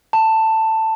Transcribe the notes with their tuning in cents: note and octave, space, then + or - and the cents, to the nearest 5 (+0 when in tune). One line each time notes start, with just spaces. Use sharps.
A5 +10